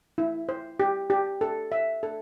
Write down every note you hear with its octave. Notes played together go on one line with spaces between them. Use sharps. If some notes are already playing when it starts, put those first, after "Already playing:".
E4
C5
G4
G4
A4
E5
A4